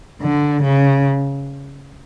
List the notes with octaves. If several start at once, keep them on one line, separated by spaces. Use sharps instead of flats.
D3
C#3